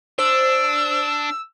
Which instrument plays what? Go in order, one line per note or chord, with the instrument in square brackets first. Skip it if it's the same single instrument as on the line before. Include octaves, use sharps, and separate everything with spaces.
[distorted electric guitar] D4 [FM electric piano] C5 [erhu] E6